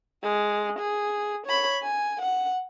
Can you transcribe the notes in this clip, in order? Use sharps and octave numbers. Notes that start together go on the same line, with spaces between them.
G#3
G#4
C#5 B5
G#5
F#5